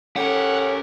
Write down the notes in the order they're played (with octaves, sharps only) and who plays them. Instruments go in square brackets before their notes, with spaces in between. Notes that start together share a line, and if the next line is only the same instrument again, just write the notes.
[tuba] C#4 [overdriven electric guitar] G4 A#4 [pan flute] A4 [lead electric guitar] F#5